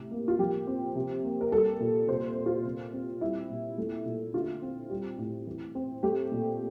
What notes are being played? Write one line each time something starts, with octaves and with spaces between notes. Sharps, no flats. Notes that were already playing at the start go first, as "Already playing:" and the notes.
Already playing: A2 C3
A#3
F4
F3 G4
C4
C3
A#3
A#4
G3 A4
A#2
C3 C5
A#3
F4
C3
C4
G3 E4
A#2
A3
A#2
D3 F4
C4
G3
A2
E3
C4
A3 G4
A#2